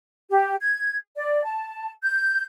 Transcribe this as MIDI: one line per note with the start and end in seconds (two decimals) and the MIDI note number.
0.30 0.55 67
0.61 0.96 92
1.15 1.44 74
1.44 1.90 81
2.02 2.45 91